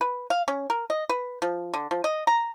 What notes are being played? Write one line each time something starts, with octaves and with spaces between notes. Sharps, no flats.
B4
F5
C#4
A#4
D#5
B4
F3
D3
F3
D#5
A#5